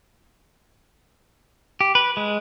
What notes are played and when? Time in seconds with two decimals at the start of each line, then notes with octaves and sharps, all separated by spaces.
1.81 G4
1.95 B4
2.17 G#3